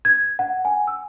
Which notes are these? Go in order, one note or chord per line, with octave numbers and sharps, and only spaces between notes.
G#6
F#5
G#5
E6